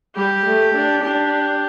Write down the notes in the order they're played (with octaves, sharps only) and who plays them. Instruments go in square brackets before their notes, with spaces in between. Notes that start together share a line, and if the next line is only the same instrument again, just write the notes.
[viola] G3 [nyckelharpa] G4
[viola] A3
D4
[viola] D4 [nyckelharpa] G4